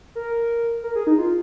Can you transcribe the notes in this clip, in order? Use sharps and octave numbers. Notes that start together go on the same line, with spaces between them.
A#4
A#4
G#4
D#4
F4